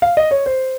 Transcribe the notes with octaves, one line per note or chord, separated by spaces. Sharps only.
F5
D#5
C#5
C5